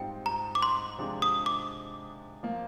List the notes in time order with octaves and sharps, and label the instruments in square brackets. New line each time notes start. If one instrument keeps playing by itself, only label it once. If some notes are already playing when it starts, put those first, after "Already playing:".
Already playing: [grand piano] G#2 G3 C4 F4 [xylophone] G5
[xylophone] A#5
D6
C6
[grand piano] C3 F3 G#3 D4
[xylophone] D#6
D6
[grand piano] F3 A#3